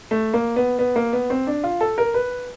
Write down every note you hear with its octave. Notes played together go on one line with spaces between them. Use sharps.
A3
A#3
B3
B3
A#3
B3
C4
D4
F4
A4
A#4
B4